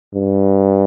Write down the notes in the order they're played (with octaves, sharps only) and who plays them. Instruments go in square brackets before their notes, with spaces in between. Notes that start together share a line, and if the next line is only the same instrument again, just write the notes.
[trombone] G2